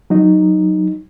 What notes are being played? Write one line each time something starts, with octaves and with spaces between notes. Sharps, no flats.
F#3 D#4